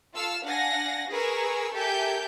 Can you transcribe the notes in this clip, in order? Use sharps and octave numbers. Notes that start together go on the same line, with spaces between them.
F4 A4 F5 E6 F6
D4 F5 F#5 G#5 A#6
G#4 A#4 B4 G#5 C#6 E6
G4 A4 A#4 E5 G#5 G6